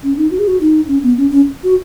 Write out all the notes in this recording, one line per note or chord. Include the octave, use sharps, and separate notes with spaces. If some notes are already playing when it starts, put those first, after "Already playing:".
C#4
D#4
F#4
G#4
F#4
D#4
C#4
B3
C#4
C#4
F#4